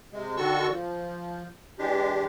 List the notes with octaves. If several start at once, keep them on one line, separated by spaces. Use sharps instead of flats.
C3 G#3
D3 D#3 F#4 A4 C#6 E6
F3
E3 G#3 D4 G4